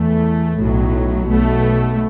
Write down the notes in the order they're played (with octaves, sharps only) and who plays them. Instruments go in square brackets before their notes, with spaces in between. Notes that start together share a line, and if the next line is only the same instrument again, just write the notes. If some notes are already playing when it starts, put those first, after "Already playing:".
Already playing: [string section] E2 E3 A3
B1 A2 F#3
B1 B2 A3